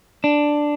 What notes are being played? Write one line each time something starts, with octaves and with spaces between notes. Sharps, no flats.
D4